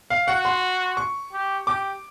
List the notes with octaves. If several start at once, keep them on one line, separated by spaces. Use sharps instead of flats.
F5
F#4 F#5
C6
C#6
G4
G4 D6